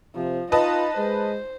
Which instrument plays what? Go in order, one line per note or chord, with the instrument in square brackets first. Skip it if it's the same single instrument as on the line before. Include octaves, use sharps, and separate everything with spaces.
[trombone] C3 [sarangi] F3
[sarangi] D#4 [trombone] F4 [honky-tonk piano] B4 D#5 A5
[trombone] G#3 [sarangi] C5